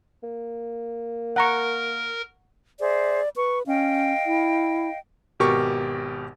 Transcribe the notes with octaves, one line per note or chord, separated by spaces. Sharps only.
A#3
A#4 F#5 A#5 C#6
G#4 C5 D5 E5
B4 C#6
C#4 D#5 F5 G5
E4
G#1 B2 G4 A#4 C#6